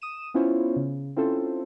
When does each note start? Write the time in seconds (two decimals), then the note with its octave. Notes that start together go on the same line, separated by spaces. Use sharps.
0.02 D#6 D#7 E7
0.34 B3 C#4 E4 F4 C5 C#5
0.76 C#3
1.16 C4 C#4 E4 F4 A4 C5